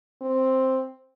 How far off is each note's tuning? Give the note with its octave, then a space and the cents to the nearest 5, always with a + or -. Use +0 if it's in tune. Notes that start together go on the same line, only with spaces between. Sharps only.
C4 +5